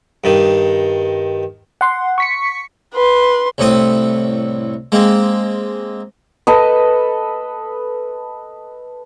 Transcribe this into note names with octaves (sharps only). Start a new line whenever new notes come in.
G2 D#3
F#5 C6
C#6 B6 C#7
B4 C6
C2 A2 C4 D#6
G#3 A#3 C4
A4 B4 D#5